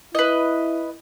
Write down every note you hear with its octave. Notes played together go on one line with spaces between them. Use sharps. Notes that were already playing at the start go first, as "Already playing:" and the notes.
E4 B4 D#5